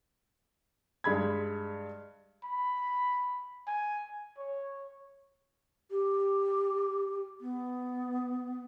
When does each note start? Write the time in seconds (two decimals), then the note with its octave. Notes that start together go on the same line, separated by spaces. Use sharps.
1.04 G2 G#3 B5 G#6
2.44 B5
3.67 G#5
4.38 C#5
5.90 G4
7.40 B3